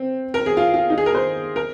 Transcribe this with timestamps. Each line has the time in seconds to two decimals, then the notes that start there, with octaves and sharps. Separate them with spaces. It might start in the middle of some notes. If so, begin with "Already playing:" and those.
Already playing: C4
0.34 A#4
0.46 G#4
0.57 F4
0.74 F4
0.90 D#4
0.98 G#4
1.06 A#4
1.15 C5
1.56 A#4